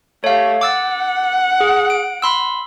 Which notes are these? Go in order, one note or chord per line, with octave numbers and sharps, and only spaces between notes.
A3 G4 C#5 F5
F#5 D6 E6 A6
G#4
D7
B5 C6 E6